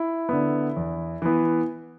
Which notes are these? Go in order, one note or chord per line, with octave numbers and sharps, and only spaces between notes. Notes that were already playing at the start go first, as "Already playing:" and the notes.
Already playing: E4
D3 B3
E2
E3 B3